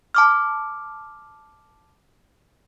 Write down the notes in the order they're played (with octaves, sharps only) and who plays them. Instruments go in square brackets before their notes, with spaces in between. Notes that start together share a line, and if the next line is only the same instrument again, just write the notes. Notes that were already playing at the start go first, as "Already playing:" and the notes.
[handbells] A5 D6 F6